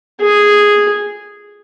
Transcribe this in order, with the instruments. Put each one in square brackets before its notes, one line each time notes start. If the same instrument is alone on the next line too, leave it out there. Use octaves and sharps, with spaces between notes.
[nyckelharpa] G#4